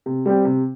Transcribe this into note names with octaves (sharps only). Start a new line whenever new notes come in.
C3
G3 C4 G4
C3